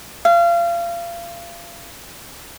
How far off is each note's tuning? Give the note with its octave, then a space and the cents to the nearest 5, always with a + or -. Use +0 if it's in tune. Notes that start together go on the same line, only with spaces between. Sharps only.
F5 -30